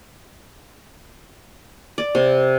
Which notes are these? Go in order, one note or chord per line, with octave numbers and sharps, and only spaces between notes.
D5
C3